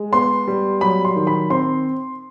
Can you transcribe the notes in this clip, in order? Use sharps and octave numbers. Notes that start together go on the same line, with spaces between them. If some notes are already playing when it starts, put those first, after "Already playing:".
Already playing: G#3
B3 C6
G3
F#3 B5
C6
D#3
B5
C4 C6